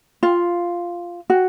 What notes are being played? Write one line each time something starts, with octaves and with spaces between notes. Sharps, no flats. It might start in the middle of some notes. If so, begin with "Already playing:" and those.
F4
F#4